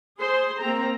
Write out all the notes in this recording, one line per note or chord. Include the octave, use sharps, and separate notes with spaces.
G#4 C5 C6
A#3 C4 A#5